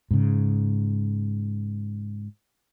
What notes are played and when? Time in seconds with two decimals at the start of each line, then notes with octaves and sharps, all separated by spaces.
0.11 G#2 C#3